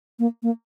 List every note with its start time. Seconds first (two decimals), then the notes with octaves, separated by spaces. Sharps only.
0.19 A#3
0.43 A#3